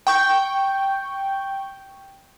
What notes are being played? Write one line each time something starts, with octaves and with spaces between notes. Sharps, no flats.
G5 C#6 G6